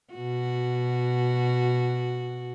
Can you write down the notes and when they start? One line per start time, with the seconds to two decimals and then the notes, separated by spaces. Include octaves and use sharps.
0.13 B2 F#4